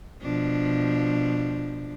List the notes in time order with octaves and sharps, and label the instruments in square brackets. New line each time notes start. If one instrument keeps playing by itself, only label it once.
[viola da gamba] B2 F3 D4